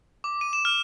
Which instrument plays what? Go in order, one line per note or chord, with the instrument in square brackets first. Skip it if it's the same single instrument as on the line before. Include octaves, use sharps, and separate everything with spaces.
[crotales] D6
D#7
E7
F6